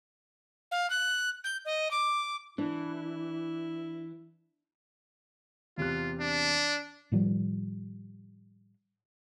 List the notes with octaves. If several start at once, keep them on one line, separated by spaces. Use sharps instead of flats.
F5
F#6
G6
D#5
D6
E3 D4 E4
E2 C3 F4 F#6
D4
A2 D#3 F3 G3